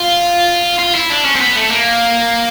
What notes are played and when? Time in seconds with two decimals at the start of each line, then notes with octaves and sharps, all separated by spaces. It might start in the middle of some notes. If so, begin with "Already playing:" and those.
Already playing: F4
0.80 F4
0.95 E4
1.10 D4
1.25 C#4
1.35 C4
1.40 B3
1.56 A3
1.71 A#3